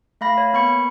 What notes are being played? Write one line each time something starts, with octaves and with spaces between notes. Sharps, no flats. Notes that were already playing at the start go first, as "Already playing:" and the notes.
A3 F5 B5 A#6
C#5
A#3 B3 B5 C#6 C#7